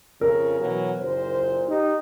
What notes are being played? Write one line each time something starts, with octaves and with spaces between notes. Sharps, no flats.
F2 C#3 A#4
B2 E3 F#3
F#1 A#2 C5
D#4 G4